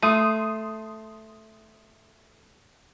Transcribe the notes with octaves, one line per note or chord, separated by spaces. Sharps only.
A3 C6 D#6 D#7